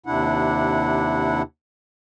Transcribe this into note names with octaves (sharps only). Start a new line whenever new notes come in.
D#2 C3 D4 E4 F#5